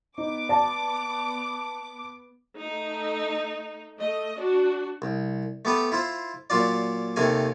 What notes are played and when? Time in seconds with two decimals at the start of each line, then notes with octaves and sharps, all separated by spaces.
0.18 B3 D#4 D6
0.49 D5 A5
2.58 A3 D#4
3.99 A3 D#5
4.37 D4 F#4
5.02 C2
5.65 A3 B3 G4 B4
5.92 E4 F4 C5
6.50 A#2 F#3 F4 D5
7.16 D#2 C3 A3 A#4 G#5